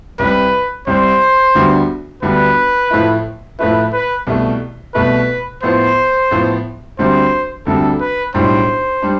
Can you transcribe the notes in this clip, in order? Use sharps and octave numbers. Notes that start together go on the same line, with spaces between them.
C2 C3 G3 B4
C2 C3 G3 C5
D2 D3 G3 B3 D4
D2 D3 G3 B3 D4 B4
A2 F3 A3 E4
A2 F3 A3 E4 B4
B4
C2 B2 A3
C2 B2 A3 B4
A2 F3 B3 C5
A2 F3 B3
D2 C3 G3 D4 C5
D2 C3 G3 D4 A4
B4
B1 A2 G3 D4 C5
G3 D4